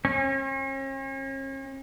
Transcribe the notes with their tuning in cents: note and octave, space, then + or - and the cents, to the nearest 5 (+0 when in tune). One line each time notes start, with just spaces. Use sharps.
C#4 -45